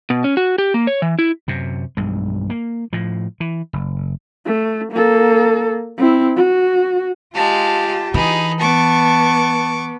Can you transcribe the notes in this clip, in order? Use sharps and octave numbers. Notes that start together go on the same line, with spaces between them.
B2
C#4
F#4
G4
A#3
C#5
E3
E4
F#2 C3
B1 G2 G#3
A#3
A2 F3
E3
F#1
A3
A#3 A4
C4 E4
F#4
G#3 F4 G4 F5 A5
E3 D#4 G#4 B5
B3 A5 C#6 D6